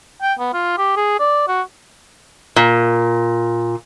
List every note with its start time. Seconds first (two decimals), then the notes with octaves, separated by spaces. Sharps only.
0.22 G5
0.39 B3
0.53 F4
0.78 G4
0.96 G#4
1.19 D5
1.48 F#4
2.56 A#2